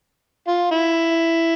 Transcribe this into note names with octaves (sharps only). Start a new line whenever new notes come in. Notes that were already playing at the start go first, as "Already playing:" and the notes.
F4
E4